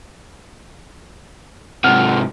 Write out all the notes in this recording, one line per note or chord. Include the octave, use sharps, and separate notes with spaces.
G#2 C3 F#5 F6